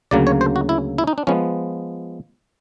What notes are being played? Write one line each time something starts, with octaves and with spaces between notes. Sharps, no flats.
D2 C#3 F#3 A#3 D5
C#5
C5
F#4
E4
E4
D#4
D4
F3 G#3 B3 C#4